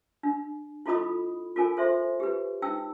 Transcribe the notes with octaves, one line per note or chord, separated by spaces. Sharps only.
D4
E4 F4 A4 D#5 B5 D#6
F4 A4 A#4 G#5
A4 C5 E5 C6
G4 B4
D#4 G5 E6